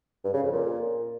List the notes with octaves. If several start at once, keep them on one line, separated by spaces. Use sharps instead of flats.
G2
C#3
F2
A#2